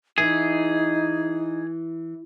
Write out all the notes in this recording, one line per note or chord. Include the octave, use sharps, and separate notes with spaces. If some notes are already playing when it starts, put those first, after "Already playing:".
E3 D#4 G#4